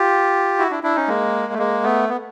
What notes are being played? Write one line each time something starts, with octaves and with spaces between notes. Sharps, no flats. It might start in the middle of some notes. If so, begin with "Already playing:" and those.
Already playing: F4 G4
E4 F#4
D4 E4
D4 E4
C#4 D#4
G#3 A#3
A3
G#3 A#3
A3 B3
B3